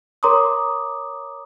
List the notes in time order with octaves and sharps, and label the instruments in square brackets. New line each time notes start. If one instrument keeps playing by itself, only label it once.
[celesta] A#4 C#5 A#5 C6 D6 D#6